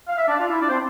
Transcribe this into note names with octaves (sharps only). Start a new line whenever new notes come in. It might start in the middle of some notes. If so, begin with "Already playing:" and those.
F5
E5
D4 D5
F4 F5
E4 E5
D4 D5
C4 C5